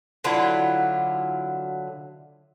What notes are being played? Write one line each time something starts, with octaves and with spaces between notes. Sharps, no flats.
D3 F#3 E4 F4